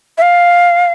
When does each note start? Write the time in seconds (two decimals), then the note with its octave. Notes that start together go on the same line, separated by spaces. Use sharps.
0.18 E5
0.22 F5